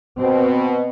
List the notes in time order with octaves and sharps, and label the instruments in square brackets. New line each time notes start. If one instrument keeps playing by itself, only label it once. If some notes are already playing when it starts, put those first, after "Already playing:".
[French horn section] B2 [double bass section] C4